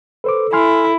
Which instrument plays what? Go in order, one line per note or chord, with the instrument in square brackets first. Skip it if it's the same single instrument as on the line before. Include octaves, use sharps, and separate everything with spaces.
[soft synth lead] A4 [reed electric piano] B4 C5 D6
[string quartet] E4 [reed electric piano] G#5 C6 F6